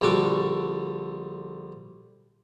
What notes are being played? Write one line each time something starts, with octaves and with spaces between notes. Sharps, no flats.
A#1 D3 G3 F#4 A4 D6